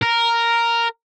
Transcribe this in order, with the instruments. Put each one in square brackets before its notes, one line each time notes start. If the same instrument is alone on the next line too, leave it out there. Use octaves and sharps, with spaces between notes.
[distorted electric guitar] A#4